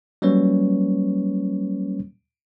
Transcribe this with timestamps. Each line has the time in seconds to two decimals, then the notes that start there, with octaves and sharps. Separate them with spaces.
0.22 F#3 G3 A#3 C#4 B4 C#5